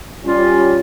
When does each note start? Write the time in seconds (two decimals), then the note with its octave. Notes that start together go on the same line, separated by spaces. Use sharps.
0.25 G3 C#4 F4